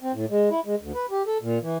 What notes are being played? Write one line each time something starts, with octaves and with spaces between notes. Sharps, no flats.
C4
A2
G#3
E4
G#3
D2
B4
G4
A4
A#2
E3